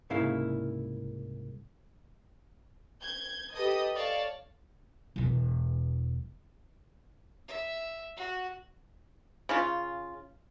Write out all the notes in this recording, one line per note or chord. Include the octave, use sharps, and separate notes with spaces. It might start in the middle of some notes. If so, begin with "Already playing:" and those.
C2 G#2 C#3 A#3 E4 F5
G6 G#6
G4 A4 B4 D#5 D#6
A4 C#5 D5 F5 A5
E1 E2
E5
F#4
C#3 C#4 F4